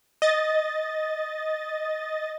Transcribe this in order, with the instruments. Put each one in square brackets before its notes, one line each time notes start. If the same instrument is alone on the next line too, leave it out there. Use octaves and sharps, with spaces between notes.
[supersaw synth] D#5 A6